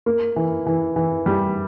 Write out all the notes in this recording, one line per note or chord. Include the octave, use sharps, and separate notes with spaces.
A#3
E3
E3
E3
G3